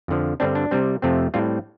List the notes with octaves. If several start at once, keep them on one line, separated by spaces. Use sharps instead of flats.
F2 D3 F3
G2 D3 G3 C4 D4
D4
C3 G3 C4
F2 C3 A3 C4
A2 G3 C4 F4